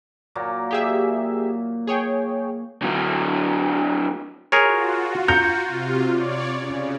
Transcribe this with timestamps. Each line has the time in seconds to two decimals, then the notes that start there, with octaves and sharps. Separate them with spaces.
0.35 A#2 F#3 A#3
0.71 G4 G#4 E5
1.87 G#4 C#5 G5
2.83 D3 F#3
4.52 F4 F#4 G#4 A#4 C#5
5.28 A#5 G6 C#7
5.68 C3 F4
6.09 C#5 D5
6.53 C#3